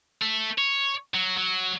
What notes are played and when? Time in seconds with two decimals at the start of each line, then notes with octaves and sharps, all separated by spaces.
0.22 A3
0.58 C#5
1.15 F#3
1.38 F#3